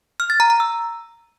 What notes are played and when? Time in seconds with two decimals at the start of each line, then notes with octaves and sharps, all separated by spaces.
0.20 F6
0.30 A6
0.40 A#5
0.50 A#5
0.60 E6